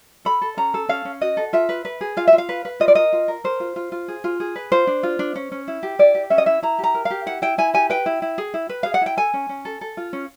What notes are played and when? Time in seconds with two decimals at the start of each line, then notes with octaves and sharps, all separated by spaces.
0.25 A4 B5
0.42 A4
0.57 C#4 A#5
0.74 A4
0.89 C#4 F5
1.05 C#4
1.21 F#4 D#5
1.37 A4
1.53 F4 E5
1.69 B4
1.85 B4
2.01 G#4
2.17 F4 F5
2.28 E5
2.33 F4
2.38 F5
2.49 B4
2.65 B4
2.80 F4 D#5
2.88 D5
2.95 A#4 D#5
3.13 F4
3.28 A#4
3.44 A#4 C5
3.60 F4
3.76 F4
3.92 F4
4.08 G#4
4.24 F4
4.40 G#4
4.56 B4
4.72 F4 C5
4.87 D4
5.03 F4
5.19 D4
5.35 C#4
5.52 C#4
5.68 E4
5.83 G4
5.99 E4 D5
6.15 G4
6.30 C#4 E5
6.38 D#5
6.46 E4 E5
6.63 E4 A#5
6.79 G4 A#5
6.94 A#4
7.05 F5
7.11 G4
7.26 E4 F#5
7.42 E4 G5
7.58 E4 G#5
7.74 G4 G#5
7.90 B4 G5
8.06 E4
8.22 E4
8.38 G#4
8.54 E4
8.69 B4
8.83 G#4 F5
8.94 F#5
9.01 E4 G5
9.17 A4 G#5
9.34 C#4
9.49 C#4
9.65 A4
9.81 A4
9.97 F4
10.13 C#4